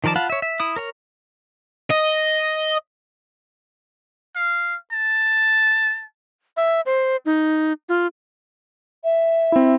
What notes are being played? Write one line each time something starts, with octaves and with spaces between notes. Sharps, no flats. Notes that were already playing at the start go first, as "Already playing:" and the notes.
D#3 F3 A#4 D5 A5
F4 F5 F#5 A5 B5
C#5 E5
E5
E4 D#6
A#4 C#5 A#5
D#5
F5
A5
E5
C5
D#4
F4
E5
C4 E4